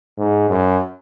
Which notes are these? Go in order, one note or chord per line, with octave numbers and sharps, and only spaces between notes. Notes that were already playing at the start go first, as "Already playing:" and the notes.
G#2
F#2